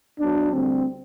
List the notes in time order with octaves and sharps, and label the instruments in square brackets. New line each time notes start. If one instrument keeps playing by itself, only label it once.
[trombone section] B1 B2 F#3 D4
D2 D3 G3 C4